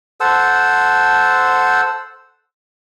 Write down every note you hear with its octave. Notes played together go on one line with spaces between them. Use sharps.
A4 C5 F#5 E6